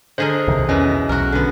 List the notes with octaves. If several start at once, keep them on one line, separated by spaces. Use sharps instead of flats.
D3 G#4 A#4 C5 D#5
B1 C3 D#3
E2 B2 E3 C#4 D#5 A#6
B1 F#4 A#4
D3 B3